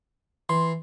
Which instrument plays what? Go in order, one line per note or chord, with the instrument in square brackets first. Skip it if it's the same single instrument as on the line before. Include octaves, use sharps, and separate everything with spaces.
[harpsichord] E3 [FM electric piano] C6